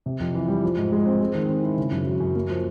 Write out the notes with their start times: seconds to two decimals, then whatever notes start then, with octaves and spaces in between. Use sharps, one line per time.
0.06 C3
0.20 F2
0.35 E3
0.48 G3
0.63 F3
0.77 G#2
0.92 G#3
1.05 C4
1.21 G#3
1.35 D#3
1.49 C4
1.63 E4
1.77 C#3
1.92 F#2
2.07 F#3
2.20 F#2
2.36 A#3
2.50 F3